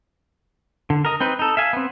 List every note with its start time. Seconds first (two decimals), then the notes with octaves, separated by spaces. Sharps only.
0.90 D3
1.05 A#4 D#5
1.20 C4 D#4 B4
1.39 D#4 A4
1.57 E5 F5 G#5
1.73 B3 C4